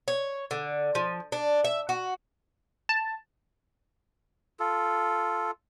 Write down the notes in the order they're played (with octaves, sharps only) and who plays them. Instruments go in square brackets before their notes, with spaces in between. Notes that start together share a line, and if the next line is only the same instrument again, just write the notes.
[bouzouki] C#5
D3
F3
D4
E5
F#4
[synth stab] A5
[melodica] F4 A4